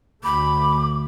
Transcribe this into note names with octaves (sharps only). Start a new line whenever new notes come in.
D2 A3 B5 D6